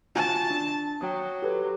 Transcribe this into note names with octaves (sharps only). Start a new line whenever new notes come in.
F4 F#4 G#5 A5
D4
F#3 G5 D#6
G4 A4 B4